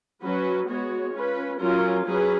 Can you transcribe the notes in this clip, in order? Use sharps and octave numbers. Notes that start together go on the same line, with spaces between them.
F#3 C#4 F#4 B4
G#3 B3 F#4 C#5
C#4 F4 B4
F#3 C#4 F4 A#4
F#3 C#4 G#4 B4